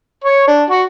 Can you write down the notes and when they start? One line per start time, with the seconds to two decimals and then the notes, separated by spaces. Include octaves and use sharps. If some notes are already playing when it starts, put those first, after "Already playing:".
0.24 C#5
0.48 D4
0.70 F#4